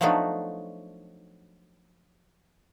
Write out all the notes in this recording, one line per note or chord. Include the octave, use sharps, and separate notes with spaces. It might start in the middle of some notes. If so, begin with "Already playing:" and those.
F3 F#3 A3 B3 D4 D#4